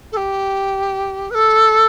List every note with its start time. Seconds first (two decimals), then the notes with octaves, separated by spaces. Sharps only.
0.12 A4
0.17 G4
1.30 B4
1.34 A4